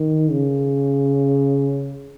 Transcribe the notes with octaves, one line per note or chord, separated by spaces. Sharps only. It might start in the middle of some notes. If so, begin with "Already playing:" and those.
Already playing: D#3
C#3